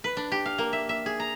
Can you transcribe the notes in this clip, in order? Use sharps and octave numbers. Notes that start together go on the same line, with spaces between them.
B4
D4
G4
F5
A#3
E5
E5
G#4
A#5